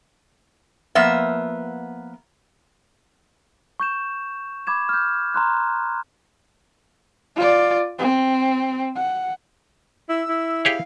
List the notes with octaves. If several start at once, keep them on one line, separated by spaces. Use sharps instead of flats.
F3 A#3 B3 E5
C#6 G6 E7
B5 D6 G#6 E7
F6 G6
A#5 C6 F#6
F4 D5
C4
F#5
E4 E6
E4
G4 G#4 C#5 F5